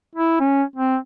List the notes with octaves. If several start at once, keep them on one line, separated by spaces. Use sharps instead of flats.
E4
C#4
C4